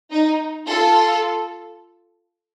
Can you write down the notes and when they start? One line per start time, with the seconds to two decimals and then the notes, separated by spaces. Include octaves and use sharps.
0.11 D#4
0.66 F4 A4